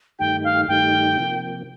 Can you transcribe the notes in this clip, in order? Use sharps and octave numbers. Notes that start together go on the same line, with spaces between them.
G2 D#3 A3 D#4 G4 G5
F5
G2 D#3 A3 D#4 G4 G5
C3 F3 A#3